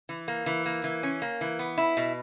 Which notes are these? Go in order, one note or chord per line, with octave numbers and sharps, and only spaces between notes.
E3
A#3
E3
A#3
E3
C#4
A#3
E3
B3
E4
B2